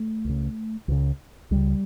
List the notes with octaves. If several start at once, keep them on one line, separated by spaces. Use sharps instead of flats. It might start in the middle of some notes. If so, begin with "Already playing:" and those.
Already playing: A3
C#2 C#3
C#2 C#3
C#2 C#3 G3